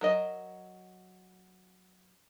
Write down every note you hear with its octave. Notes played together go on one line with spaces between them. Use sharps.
F#3 A#4 D#5